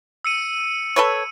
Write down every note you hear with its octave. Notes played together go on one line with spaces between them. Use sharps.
E6 C#7 D#7
A4 B4 C#5